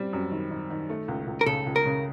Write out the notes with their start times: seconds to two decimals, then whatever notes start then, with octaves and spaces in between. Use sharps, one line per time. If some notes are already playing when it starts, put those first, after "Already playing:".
Already playing: G3 C4
0.13 F#2
0.32 D#3
0.51 D#3
0.70 D#3
0.90 A3
1.08 C#2
1.27 C#2
1.41 A#4
1.46 C#3 A4
1.66 C#2
1.76 A#4
1.86 C#3